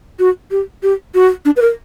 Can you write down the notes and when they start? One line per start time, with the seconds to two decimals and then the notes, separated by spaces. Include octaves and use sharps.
0.19 F#4
0.51 G4
0.83 G4
1.15 F#4
1.45 D4
1.57 B4
1.62 A#4